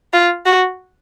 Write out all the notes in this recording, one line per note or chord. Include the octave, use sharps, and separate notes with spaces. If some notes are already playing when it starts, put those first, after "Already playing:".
F4
F#4